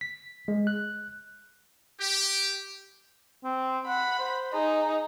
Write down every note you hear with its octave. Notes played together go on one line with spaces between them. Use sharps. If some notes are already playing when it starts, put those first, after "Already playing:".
B6
G#3
F#6
G4
C4
F#5 B5
C5
D#4 G#4